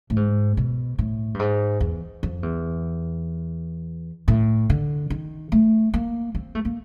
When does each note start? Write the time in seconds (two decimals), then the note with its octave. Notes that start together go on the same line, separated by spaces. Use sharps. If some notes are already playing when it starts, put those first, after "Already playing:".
0.10 A2
0.16 G#2
0.57 B2
0.98 A2
1.34 G2
1.39 G#2
1.80 E2
2.23 F2
2.43 E2
4.28 A2
4.70 D3
5.10 D#3
5.52 A3
5.94 A#3
6.35 C4
6.55 A3
6.65 A#3